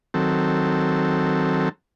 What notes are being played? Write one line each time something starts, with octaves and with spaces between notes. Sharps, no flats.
D#3 F#3 C4 A4